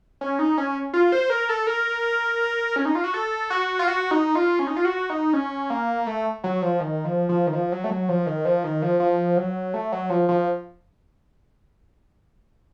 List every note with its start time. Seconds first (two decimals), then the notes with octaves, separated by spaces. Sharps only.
0.21 C#4
0.39 D#4
0.58 C#4
0.93 F4
1.12 C5
1.30 A#4
1.49 A4
1.67 A#4
2.76 C#4
2.85 D#4
2.95 F4
3.04 F#4
3.14 A4
3.50 F#4
3.79 F4
3.87 F#4
4.11 D#4
4.35 F4
4.59 C#4
4.67 D#4
4.76 F4
4.85 F#4
5.10 D#4
5.33 C#4
5.70 A#3
6.07 A3
6.44 F#3
6.62 F3
6.80 D#3
7.05 F3
7.29 F3
7.47 D#3
7.53 F3
7.72 F#3
7.84 A3
7.90 F#3
8.09 F3
8.27 D#3
8.45 F3
8.64 D#3
8.82 F3
9.00 F3
9.37 F#3
9.74 A3
9.92 F#3
10.10 F3
10.29 F3